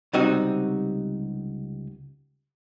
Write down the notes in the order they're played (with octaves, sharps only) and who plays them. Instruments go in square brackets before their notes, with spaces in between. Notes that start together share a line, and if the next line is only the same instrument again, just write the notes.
[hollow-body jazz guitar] C#2 C3 G3 C4 D#4 F#4